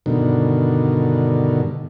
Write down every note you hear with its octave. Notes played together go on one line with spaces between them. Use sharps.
G2 B2 D3 D#3